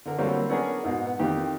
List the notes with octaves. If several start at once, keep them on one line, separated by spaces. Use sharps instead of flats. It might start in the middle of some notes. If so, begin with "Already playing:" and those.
D3 A#4
D3 F#3 G3 A3 A#3 C4
B3 C#4 D4 G#4 A#4
G#2 B2 D#4
B3
F2 D#3 G4